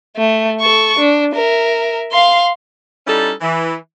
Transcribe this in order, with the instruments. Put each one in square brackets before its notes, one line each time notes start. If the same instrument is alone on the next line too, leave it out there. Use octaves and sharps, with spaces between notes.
[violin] A3
A4 C#6
D4
A#4 E5
F5 C6
[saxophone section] G3 C#4 D#4 E4 A4
E3